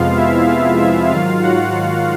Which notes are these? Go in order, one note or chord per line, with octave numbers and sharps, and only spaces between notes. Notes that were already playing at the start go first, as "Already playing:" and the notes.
Already playing: F2 C3 F3 G#3 B3 F4 F5
E4 E5
F4 F5
E4 E5
G#2 D#3 F#3 F4 F5
F#4 F#5